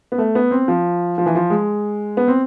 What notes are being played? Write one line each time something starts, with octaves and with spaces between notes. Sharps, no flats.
B3
A3
B3
C4
F3
F3
E3
F3
G#3
B3
C4